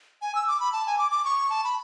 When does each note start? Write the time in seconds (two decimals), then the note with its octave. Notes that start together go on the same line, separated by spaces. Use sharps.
0.22 G#5
0.35 E6
0.48 D6
0.60 B5
0.73 A5
0.87 G#5
0.98 D6
1.11 D6
1.25 C#6
1.50 A5
1.64 B5